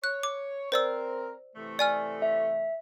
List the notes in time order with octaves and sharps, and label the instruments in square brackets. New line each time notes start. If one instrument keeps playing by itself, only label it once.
[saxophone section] C#5 [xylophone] F#6
[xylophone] D6
[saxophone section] C4 A#4 [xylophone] C5 D5 E6
[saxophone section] C3 E3 A3
[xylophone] D5 G#5 F6
[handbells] E5